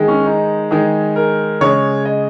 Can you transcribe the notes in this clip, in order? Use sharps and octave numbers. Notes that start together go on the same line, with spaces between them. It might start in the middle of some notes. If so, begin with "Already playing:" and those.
Already playing: D#3 G#3
C#4
D#4
D#3 G#3 G#4
A#4
C#3 G#3 C#5
D#5